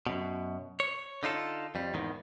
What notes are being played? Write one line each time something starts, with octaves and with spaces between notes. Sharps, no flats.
F#2 B2
C#5
D3 D#4 F4 A4
F2 G3
E2 G#2 D#3